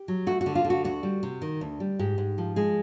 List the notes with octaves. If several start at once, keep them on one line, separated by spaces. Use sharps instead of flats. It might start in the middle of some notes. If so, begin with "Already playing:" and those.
Already playing: G4
F#3
A3 F#4
F#4
D3
F4
D3
F#4
D2 F#4
G3
C3
D#3
D2
G3
G#2 G4
G#2
F3
G#3 G#4